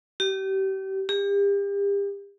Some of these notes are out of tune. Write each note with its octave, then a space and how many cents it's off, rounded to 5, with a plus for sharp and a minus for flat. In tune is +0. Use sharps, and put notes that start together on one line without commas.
G4 -30
G4 +35